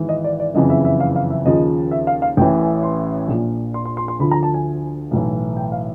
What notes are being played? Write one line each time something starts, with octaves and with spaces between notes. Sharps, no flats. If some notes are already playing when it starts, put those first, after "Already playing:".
Already playing: G#1 G#2 E3
D#5
D5
D5
F#1 F2 C#3 E3 D#5
E5
E5
F5
F5
E5
D#2 C#3 F3 D#5
E5
F5
F5
A1 A2 E3 G5
G#5
C6
A#1 A#2 F3
C6
C6
C6
C6
D2 D3 F3 B5
A#5
A5
G#5
B1 A2 E3
G5
F5